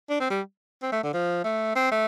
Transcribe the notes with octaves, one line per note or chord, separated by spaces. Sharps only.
D4
C4
G3
C4
A3
D3
F3
A3
C4
A3